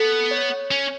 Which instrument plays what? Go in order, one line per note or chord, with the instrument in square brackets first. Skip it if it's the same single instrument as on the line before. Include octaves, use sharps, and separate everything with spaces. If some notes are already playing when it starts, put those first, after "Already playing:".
Already playing: [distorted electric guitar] B3 [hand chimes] A4
[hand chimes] C#5
[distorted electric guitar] C#4